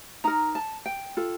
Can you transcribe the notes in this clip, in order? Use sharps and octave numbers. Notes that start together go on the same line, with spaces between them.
D#4 A#4 A#5
A5
G5
F4 A4